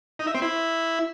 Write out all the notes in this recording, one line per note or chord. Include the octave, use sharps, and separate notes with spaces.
D#4
E5
C4
E4